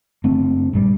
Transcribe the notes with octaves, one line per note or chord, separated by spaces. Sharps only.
F#1 A3 C4 D4
A#1 G2 G3